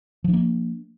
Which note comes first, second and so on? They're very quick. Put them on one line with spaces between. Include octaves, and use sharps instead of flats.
F3 D4 A#3